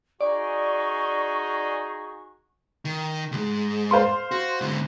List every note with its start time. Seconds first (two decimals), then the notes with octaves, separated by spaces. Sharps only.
0.21 D#4 F#4 G#4 D5 C#6
2.85 D#3
3.32 C#2 G#2
3.91 C5 F5 C6
4.31 F#4
4.61 G#2 D3